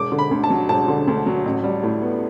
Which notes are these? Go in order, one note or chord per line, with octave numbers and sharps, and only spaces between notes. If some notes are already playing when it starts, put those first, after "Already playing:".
Already playing: E1 D6
D3
B5
D2
A5
F#3
E1 A5
D3
D2
F#3
A1
G3
A2
B3